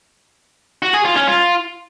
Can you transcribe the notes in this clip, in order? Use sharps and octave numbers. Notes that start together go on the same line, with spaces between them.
F#4
G#4
F4
C#4
F4